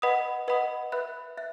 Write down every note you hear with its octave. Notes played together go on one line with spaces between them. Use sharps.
B4 D#5 F#5 B5 D#6
B4 D#5 F#5 B5 D#6
B4 E5 B5 F#6
E5 F#6